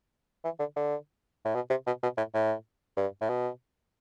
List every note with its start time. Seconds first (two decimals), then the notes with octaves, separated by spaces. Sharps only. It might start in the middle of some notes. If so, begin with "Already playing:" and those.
0.44 E3
0.59 D3
0.76 D3
1.45 A2
1.55 B2
1.70 C3
1.86 B2
2.03 B2
2.17 A2
2.34 A2
2.97 G2
3.21 A2
3.29 B2